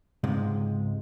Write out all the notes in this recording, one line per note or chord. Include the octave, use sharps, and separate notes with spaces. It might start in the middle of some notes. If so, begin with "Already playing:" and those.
C#2 G#2 C3 G#3